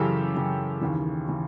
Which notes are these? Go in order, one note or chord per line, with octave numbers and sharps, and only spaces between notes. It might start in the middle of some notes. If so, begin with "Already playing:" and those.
Already playing: F#2 C#3 E3 G4 A4
F#2 C#3 E3
D#2 C#3 E3
C#3 E3